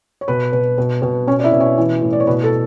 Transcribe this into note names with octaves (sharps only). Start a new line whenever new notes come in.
C#5
B2 B4
B2
B2
B2
B2 C#4 C#5
D5
E4 E5
B2
C#4 C#5
E3
A2
D5
C#5
B2 B4
A4